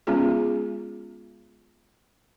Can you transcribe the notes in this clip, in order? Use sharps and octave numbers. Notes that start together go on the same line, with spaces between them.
G#3 B3 C#4 F4 G#4